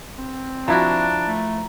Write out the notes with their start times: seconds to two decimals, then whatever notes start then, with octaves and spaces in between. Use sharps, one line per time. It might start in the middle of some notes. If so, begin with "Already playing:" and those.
0.18 C4
0.68 F3 D4 E4 F#4 A#5
1.28 A3